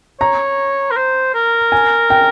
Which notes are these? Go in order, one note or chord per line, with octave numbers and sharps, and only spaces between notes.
C#5 A#5
A#4
C5
A#4
G#5
G5